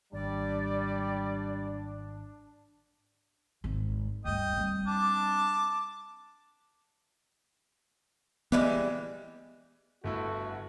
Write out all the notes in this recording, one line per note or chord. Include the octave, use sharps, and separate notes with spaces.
G#1 G3 D4 D5
G#1 G#3
D2 G2 D#5 G5
G3 C4
D4 A5 D6
E3 G3 G#3 B3
G1 A3 E4 F#4